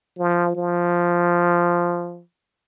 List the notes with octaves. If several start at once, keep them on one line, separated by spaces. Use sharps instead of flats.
F3
F3